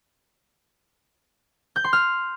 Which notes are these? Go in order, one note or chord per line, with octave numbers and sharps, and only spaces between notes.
G6
C6
F6